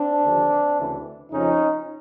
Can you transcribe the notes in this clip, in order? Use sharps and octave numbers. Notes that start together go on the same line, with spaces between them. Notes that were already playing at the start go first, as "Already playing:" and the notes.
Already playing: C4 D4
D#2 D3 F3
D2 C#3 E3
F2 C#3 F3 C#4 D#4